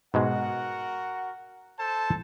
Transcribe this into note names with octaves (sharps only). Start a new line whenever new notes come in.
G#2 B2 G#3 F#4 A#4 F#5
A4 C5 A5